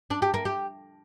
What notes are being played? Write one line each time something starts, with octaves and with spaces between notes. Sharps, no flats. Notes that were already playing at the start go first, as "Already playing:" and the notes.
D4
G4
A#3
G4